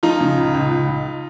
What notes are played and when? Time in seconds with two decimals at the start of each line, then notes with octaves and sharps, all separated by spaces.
0.03 F3 D#4 F4
0.21 C#3
0.37 C#2
0.54 C#2
0.71 C#2
0.88 C#2